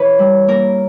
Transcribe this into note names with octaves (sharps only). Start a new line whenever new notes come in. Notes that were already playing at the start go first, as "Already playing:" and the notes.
Already playing: E3 C#4 B4 C#5
G3
A#3 A#4